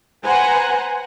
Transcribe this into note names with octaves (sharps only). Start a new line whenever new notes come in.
B4 C5 F#5 G#5 A#5